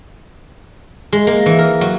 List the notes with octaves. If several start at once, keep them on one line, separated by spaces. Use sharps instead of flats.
G#3
A#3
E3
A#4
F#3